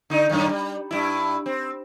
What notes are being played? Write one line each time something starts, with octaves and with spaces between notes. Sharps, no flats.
D3 D#4
F#2 A2 D#3
G3
G2 E4
C4